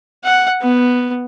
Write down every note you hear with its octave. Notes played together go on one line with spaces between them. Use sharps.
F#5
B3